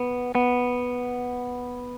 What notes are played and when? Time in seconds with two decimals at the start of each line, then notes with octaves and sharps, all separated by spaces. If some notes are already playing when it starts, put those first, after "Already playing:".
Already playing: B3
0.35 B3